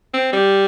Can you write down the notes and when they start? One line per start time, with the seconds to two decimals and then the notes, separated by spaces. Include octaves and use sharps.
0.14 C4
0.33 G3